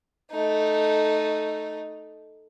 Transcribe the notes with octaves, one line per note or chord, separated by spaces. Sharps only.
A3 D#4